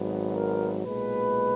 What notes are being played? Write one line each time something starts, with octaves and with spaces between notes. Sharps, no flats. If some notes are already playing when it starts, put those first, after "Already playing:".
Already playing: G#1 G#2 F#3 B3
A#4
B1 A#2 G#3 B3 B4